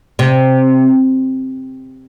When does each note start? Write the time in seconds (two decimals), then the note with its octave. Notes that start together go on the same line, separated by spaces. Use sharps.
0.19 C3